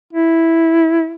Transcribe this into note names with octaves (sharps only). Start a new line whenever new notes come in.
E4